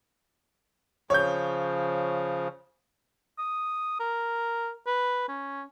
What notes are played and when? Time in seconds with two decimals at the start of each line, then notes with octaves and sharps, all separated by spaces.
1.10 C#3 F3 C#5 G6
3.39 D#6
4.00 A#4
4.87 B4
5.29 C#4